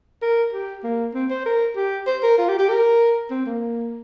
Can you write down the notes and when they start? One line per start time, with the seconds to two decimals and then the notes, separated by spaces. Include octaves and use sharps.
0.22 A#4
0.53 G4
0.84 A#3
1.14 C4
1.30 C5
1.46 A#4
1.76 G4
2.07 C5
2.23 A#4
2.38 F4
2.49 G4
2.59 G4
2.69 A#4
3.31 C4
3.46 A#3